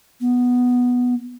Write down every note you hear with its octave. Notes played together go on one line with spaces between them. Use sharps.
B3